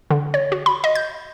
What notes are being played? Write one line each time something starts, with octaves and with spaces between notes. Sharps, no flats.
D3
C#5
F#4
B5
D#5
G6